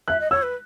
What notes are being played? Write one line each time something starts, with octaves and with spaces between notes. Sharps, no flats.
E5 F#6
D#5
C#5 E6
B4